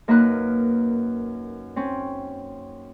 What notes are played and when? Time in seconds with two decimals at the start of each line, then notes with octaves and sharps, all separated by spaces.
0.08 F#2 A#3 D#4 B4 F6 F#6
1.76 C4 C#4